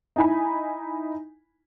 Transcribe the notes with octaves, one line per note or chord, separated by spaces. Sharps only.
D#4 E4 G#5 B5